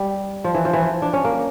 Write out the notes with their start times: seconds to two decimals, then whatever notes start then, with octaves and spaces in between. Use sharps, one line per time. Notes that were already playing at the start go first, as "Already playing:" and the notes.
Already playing: G3
0.44 F3
0.54 E3
0.65 F3
0.73 E3
0.82 F3
1.02 D4
1.13 C#4
1.24 A#3